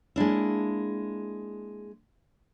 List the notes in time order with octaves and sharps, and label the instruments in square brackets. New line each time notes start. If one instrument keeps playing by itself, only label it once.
[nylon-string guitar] G#3 A#3 D4 E4